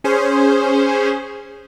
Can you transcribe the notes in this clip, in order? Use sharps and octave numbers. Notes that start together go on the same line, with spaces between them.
C#4 G#4 C5